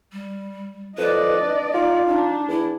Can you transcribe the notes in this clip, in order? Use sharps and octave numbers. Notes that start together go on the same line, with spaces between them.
G3
F2 B4 D5 D#5
D4
D#4 F4
D4 D#4
E2 E4